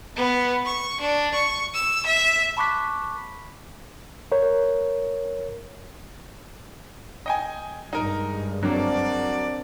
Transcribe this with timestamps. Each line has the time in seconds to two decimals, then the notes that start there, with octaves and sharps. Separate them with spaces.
0.16 B3
0.66 C#6
1.01 D4
1.35 C#6
1.74 E6
2.07 E5
2.57 A5 B5 C#6 D6 F#6 B6
4.32 A#4 C#5
7.26 D#5 G5 G#5
7.93 G2 G#3 D#4 A#4
8.63 F#3 A#3 C4 D4 F#4 A#4 D5